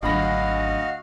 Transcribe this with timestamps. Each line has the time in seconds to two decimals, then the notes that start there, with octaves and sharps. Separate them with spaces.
0.03 G#1 D2 F#3 F#4 D#5 F5 B5 A#6